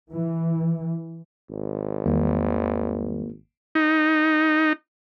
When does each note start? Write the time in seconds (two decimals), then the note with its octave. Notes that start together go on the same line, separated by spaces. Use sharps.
0.11 E3
1.50 G#1
2.06 E2 D#3 G3 A#3
3.75 D#4